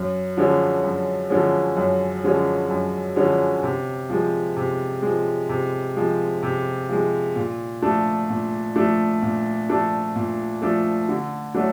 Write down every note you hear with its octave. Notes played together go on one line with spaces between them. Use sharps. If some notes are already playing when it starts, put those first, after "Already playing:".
Already playing: F#2
D3 F3 G#3 C#4
F#2
D3 F3 G#3 C#4
F#2
D3 F3 G#3 C#4
F#2
D3 F3 G#3 C#4
C3
F3 G#3
C3
F3 G#3
C3
F3 G#3
C3
F3 G#3
A#2
F3 A3 D4
A#2
F3 A3 D4
A#2
F3 A3 D4
A#2
F3 A3 D4
D3
F#3 A3 D4